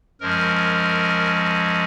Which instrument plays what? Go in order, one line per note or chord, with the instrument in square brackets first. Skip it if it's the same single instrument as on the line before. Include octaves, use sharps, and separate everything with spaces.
[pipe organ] F#2 F3 G#3 A#4